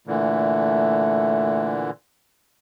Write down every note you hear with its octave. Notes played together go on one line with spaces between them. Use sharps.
A#2 D3 E3 A3